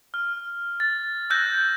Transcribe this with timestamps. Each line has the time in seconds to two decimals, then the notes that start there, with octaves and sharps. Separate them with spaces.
0.14 F6
0.80 A6
1.30 E6 F#6 G6 A#6